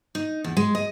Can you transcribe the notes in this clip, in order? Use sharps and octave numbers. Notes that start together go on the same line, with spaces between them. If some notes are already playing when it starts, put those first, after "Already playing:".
D#4
E2
G#3
D#5